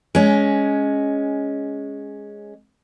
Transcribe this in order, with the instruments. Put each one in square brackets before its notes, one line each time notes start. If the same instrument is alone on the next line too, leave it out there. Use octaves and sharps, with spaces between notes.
[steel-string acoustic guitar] G#3 C#4